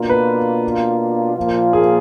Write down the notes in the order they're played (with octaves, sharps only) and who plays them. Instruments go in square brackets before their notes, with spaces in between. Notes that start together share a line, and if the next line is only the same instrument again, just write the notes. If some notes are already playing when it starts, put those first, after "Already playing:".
Already playing: [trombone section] B2 A#3 D4 F4
[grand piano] B4
[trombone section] A#2 F3 A#3 F4
[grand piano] G#4